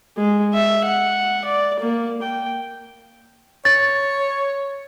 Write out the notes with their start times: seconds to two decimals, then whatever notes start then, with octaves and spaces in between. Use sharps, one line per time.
0.17 G#3
0.54 E5
0.85 F#5
1.45 D5
1.80 A#3
2.22 G5
3.65 C#5 A6